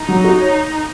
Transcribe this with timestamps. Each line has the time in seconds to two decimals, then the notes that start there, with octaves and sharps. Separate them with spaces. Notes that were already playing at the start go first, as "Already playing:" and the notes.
Already playing: D#4
0.09 F#3
0.24 F#4
0.40 C#5